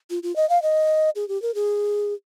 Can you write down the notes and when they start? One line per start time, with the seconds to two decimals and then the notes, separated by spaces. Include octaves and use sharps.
0.10 F4
0.23 F4
0.36 D#5
0.49 F5
0.62 D#5
1.15 G#4
1.28 G4
1.42 A#4
1.55 G#4